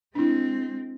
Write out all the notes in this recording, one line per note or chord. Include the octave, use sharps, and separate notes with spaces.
G#3 C4 D4 E4